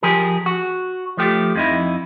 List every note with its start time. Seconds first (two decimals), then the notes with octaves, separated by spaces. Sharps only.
0.03 F3 G4 G#4 A#4
0.46 F#4
1.17 F3 A3 G4
1.55 F2 D#4 E4